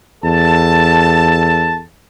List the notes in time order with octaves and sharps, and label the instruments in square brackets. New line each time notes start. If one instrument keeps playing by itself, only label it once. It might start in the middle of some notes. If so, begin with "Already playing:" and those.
[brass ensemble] E2 A4 A5